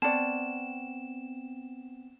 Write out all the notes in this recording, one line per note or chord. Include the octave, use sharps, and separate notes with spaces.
B3 C4 D5 A5 E7